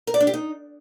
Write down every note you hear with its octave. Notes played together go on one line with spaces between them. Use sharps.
A#4
D5
D4
G4
D#4